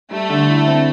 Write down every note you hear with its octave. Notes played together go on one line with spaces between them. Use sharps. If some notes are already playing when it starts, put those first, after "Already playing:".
G3 A3
D3
E4
C4